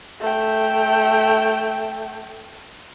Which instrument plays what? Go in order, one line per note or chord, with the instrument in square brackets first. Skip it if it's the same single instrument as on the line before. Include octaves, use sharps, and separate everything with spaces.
[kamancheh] A3 G5